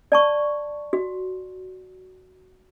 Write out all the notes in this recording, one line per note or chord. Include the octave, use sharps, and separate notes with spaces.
D5 A5 C#6
F#4